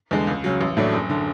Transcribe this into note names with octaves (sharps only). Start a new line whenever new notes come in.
E2 D3 G#3
C#2
C#3 F#3
A1
A2 F#3 A3 D4
F#1
D3